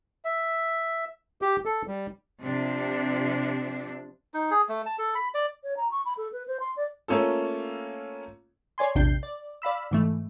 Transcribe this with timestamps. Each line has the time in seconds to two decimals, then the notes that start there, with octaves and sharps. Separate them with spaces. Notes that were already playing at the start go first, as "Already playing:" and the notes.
0.25 E5
1.42 G4
1.66 A4
1.87 G3
2.43 C3 F3 D4
4.34 D#4
4.51 G#4
4.69 A3
4.86 A5
4.98 A4
5.15 B5
5.34 D5
5.64 C#5
5.77 A#5
5.91 C#6
6.05 B5
6.17 A4
6.33 B4
6.48 C5
6.60 C6
6.77 D5
7.08 A3 A#3 C#4 F4 A4
8.78 C#5 D5 G#5 C6
8.95 A#1 E2 C3 D4 G6 C7
9.23 D5
9.62 D5 F5 B5 E6
9.91 G#2 E3 A3